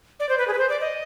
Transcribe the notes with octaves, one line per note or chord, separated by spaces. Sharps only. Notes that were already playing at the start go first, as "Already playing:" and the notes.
D5
C5
B4
G#4
B4
C5
D5
D#5